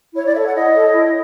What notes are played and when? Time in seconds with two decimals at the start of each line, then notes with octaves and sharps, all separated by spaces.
0.15 E4 C#5
0.25 D5
0.34 A4 C#5 E5
0.45 F#5
0.54 E4 D#5
0.74 A4 C#5
0.93 E4